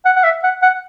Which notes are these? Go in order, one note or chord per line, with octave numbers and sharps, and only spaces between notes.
F#5
F#5
E5
F#5
F#5